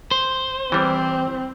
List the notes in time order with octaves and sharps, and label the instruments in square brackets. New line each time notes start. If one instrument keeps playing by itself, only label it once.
[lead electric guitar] C5
[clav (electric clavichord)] E3 G3 [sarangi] C4